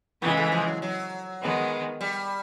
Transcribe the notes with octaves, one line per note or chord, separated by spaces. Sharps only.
C#3 E3 G#3 B3
A3
F3
F#3
F#3
D#3 G#3 B3
G3